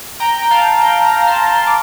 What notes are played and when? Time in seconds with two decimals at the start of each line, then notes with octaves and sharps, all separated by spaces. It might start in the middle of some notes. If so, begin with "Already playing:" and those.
0.20 G5 A#5
0.39 G5
0.50 F5 A5
0.81 G5 A#5
1.04 G5 A#5
1.21 A#5
1.27 A5 C6
1.49 A5 C6
1.67 D6